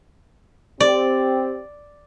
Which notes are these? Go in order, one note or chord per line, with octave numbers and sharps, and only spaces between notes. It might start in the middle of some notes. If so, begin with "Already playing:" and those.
C4 G4 D5